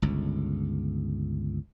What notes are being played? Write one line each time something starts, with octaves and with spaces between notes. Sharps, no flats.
G1 C#2